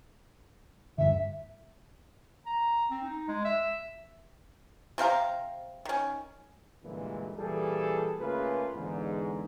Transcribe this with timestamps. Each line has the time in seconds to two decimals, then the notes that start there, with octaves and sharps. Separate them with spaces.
0.98 D#1 G2 D3 E5
2.46 A#5
2.90 C4
3.03 D#4
3.28 G#3
3.45 E5
4.98 C3 C4 F5 A#5
5.85 D#3 C#4
6.83 A1 G2 A#2 D3 E3 G#3
7.38 A#2 E3 G3 G#4 A4
8.19 C#3 A3 A#3 F4 G#4 B4
8.75 E2 G#2 D3